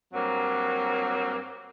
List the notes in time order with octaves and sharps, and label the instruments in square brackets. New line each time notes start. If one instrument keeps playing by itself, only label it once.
[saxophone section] G2 F#3 A#3 C4